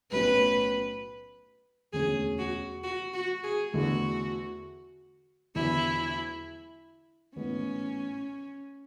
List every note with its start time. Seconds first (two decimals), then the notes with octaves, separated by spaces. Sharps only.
0.12 B1 A2 F#3 C#4 B4
1.93 E1 D2 D3 F#3 C#4 G#4
2.39 F#4
2.84 F#4
3.14 F#4
3.44 G#4
3.73 E2 D3 A3 E4 F#4
5.55 E2 D3 F#3 E4
7.36 A1 G#2 E3 B3 C#4